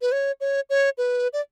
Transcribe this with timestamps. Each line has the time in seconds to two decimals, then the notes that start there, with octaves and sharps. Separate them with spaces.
0.02 B4
0.12 C#5
0.41 C#5
0.70 C#5
0.98 B4
1.33 D5